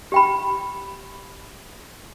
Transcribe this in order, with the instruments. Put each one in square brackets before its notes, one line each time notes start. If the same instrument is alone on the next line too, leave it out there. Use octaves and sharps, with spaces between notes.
[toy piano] G4 G5 B5